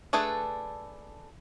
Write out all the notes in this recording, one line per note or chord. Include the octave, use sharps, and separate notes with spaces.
A3 D4 G#4 A4 B4